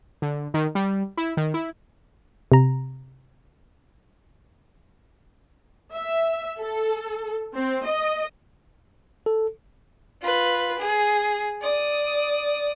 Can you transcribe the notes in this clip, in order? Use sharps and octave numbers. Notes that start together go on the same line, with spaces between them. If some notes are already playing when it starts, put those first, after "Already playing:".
D3
D#3
G3
E4
D#3
E4
C3 A#5
E5
A4
C4
D#5
A4
F4 B4
G#4
D5 D#6